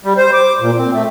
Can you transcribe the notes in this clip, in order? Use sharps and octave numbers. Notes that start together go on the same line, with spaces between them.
G3
C5
D6
A#2
C4
A3